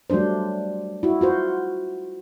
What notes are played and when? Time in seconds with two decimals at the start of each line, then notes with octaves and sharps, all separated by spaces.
0.10 F#3 G3 A3 D4 C5
1.03 E4 F#4
1.21 F4 F#4 C5